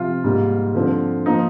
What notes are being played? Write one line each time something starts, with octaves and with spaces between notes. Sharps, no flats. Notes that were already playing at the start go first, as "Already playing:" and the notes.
Already playing: C3 F3 C4 F4
G#2 G3 A#3
D3 F3 C4
F3 A#3 D#4